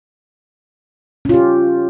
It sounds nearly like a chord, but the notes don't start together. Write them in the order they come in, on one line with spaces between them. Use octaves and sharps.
C#4 F4 G4